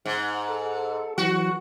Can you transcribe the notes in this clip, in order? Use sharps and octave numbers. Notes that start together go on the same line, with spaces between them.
G#2
A4
E3 F#3 F#4